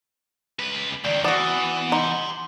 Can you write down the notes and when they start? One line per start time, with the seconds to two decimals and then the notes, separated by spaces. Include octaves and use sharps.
0.59 C#2 B4
1.05 C#2 D#3 D5 F5 G5
1.24 E3 B3 F#4 D5 F#5
1.92 D#4 G4 C6